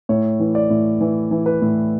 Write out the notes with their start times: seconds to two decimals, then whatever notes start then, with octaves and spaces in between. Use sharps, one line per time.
0.09 A2 C#5
0.39 E3
0.55 D5
0.70 A2
1.01 E3
1.31 E3
1.46 B4
1.62 A2